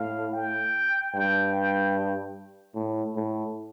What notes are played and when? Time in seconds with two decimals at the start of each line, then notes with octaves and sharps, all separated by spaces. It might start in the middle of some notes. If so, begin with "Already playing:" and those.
Already playing: A2 F5
0.33 G5
1.14 G2 G5
1.54 G5
2.75 A2
3.16 A2